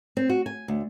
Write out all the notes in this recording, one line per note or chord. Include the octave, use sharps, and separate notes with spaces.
C4
F#4
G#5
D2